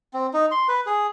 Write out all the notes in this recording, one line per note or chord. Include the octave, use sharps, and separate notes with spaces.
C4
D#4
C6
B4
G#4